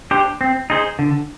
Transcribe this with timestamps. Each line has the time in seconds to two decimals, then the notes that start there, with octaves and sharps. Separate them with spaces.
0.11 D4 G4 C5
0.41 C4
0.70 D#4 G#4 C5
0.99 D3